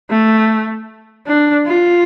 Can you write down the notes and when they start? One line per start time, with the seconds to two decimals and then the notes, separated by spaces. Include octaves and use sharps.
0.11 A3
1.27 D4
1.67 F4